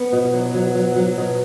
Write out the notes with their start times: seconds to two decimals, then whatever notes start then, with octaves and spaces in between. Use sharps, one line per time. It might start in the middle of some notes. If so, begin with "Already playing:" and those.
Already playing: B3
0.13 B2
0.34 F#3
0.54 F#3
0.75 F#3
0.96 F#3
1.17 B2